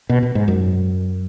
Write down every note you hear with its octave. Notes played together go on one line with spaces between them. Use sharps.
B2
B2
G#2
F#2